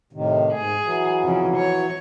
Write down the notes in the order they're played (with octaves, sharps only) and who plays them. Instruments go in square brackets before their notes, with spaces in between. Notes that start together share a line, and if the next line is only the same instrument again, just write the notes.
[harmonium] A2 C3 D#3
[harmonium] G#2 [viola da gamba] G#4
[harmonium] E3 F#3
[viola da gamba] F2 C#3
C#5